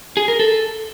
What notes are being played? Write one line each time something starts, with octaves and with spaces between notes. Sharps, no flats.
G#4
A#4
A4